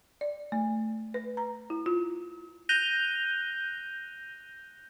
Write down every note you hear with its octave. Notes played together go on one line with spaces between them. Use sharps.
D5
A3
B4
A#5
E4
F4
F#6 G6 A#6 D#7 F7 G7